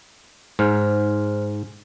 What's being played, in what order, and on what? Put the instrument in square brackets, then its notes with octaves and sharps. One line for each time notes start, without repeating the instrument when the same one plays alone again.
[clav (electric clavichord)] G#2 [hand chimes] C5 F6